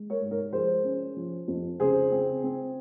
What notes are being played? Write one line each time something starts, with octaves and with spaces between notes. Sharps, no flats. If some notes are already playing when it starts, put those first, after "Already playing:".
Already playing: G#3
A#4 C#5
G#2
A#4 C#5
F3 G#4 C5
C#4
F3
F2
C#3 G#4 C5
C4
C4